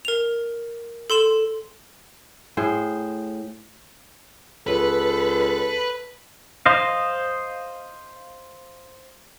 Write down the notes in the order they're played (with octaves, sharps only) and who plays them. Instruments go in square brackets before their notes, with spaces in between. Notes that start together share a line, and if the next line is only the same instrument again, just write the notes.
[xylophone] A#4 F7
A4 C6 E7
[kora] A2 G#4 C5
[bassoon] C#2 [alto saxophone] A4 [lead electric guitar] B4
[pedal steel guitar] C5 D#5 F5